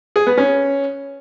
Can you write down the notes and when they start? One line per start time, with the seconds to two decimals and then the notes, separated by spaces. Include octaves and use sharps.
0.16 G#4
0.27 B3
0.38 C#4